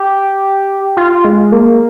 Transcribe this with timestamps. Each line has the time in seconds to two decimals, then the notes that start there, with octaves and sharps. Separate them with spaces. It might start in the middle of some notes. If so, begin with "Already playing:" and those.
Already playing: G4
0.97 F4
1.25 G#3
1.52 A#3